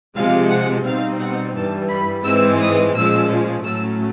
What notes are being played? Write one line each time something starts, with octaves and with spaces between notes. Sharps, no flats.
C3 F3 G#3 F5
F#5
B2 G3 C4 D#4 F5
F#5
G2 E3 G3 A5
B5
G#2 E3 G#3 C4 E6
D#6
A#2 F3 G#3 C#4 E6
A2 F#3 A3 C#4 E6